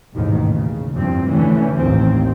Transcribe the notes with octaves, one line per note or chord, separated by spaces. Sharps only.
A1 D#2 G#2 B2 D#3
C#3
F1 E2 G2 F3 C4
F1 D3 E3 A3 C#4
A1 D#2 D#3 C4